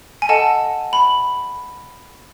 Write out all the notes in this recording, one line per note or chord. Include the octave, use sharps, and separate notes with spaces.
G#5
A4 D#5 F#5 A5
B5